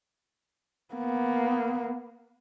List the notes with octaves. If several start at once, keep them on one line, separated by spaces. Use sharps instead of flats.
A#3 B3